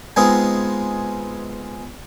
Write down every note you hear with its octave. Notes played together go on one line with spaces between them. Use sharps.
G#3 B3 C4 D#4 F4 G#4